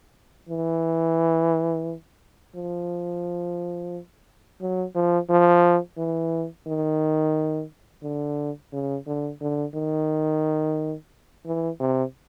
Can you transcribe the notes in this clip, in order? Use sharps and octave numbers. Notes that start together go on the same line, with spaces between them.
E3
F3
F#3
F3
F3
E3
D#3
D3
C#3
D3
D3
D#3
E3
C3